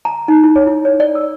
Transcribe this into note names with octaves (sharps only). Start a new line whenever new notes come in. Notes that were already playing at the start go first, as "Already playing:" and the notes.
A#5
D#4
E4
C#5
E4
C#5
D5
E6